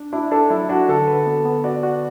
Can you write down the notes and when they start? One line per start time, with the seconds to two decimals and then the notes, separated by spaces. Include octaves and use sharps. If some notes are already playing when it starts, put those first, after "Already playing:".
Already playing: D4
0.13 D4 E4
0.31 D4 A4
0.50 F#3 E4
0.69 D4 F#4
0.89 D3 A4
1.07 B4
1.26 B3
1.45 B3
1.64 F#4 D5
1.83 F#4